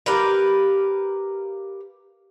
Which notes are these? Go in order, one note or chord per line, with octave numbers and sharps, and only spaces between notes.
G4 A#4 B4 F5